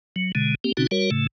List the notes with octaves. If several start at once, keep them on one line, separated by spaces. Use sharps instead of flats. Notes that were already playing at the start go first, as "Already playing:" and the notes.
F#3
B2 D3 G#3
A#3 C4 G4
B2 D3 C4 C#4 D#4 F#4
G3 F#4 A#4 C#5
A2 C#3 A3